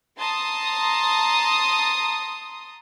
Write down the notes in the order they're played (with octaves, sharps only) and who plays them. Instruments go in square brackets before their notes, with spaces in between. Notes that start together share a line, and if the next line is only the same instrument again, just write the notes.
[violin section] A5 A#5 C6 D#6